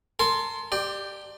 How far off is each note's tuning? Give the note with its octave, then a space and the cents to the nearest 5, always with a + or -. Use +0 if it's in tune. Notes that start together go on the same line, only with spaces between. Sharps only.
A#4 -35 A5 -40 C6 +5
G4 +0 D5 +25